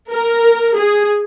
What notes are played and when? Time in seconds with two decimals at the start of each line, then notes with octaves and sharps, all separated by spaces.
0.11 A#4
0.76 G#4